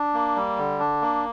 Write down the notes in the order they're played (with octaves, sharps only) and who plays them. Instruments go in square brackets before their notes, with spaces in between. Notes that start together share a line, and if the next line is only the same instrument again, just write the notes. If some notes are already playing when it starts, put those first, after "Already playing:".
Already playing: [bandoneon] D4
A#3
G3
D3
D4
A#3